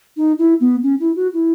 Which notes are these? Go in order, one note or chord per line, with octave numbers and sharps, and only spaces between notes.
D#4
E4
B3
C#4
E4
F#4
E4